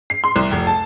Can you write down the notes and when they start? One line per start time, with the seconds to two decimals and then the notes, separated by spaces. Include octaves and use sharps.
0.10 C7
0.24 C6
0.36 C2
0.51 F1
0.67 A5